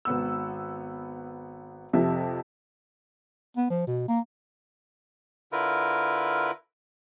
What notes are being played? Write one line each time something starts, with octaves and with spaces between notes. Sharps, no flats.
G#1 B3 E6
F2 C3 F3 E5
B3
F3
B2
A#3
D3 E4 F4 A#4 B4